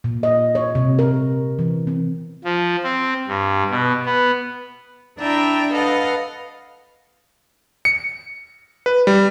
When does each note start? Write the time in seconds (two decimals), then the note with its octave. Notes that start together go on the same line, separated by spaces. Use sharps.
0.04 A#2
0.23 D#5
0.55 C#5
0.75 C3
0.99 A#4
1.59 E3
1.87 C4
2.44 F3
2.83 C4
3.28 G2
3.70 B2
4.06 B3
5.17 D4 E4 D5 E5 G5 A#5
5.72 A4 B4 D#5 F5 F#5
7.85 C#7
8.86 B4
9.07 G3